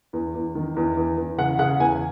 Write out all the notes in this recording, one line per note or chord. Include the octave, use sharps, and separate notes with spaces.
E2
E2
D#3
E2
E2
E2
C#3 F#5
C#3 F#5
E2 G#5